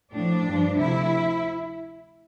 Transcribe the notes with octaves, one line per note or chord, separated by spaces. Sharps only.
A2 F3 D4
G2 F3
D2 C3 F3 E4